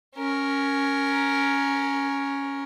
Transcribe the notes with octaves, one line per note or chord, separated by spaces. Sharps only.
C#4 A#4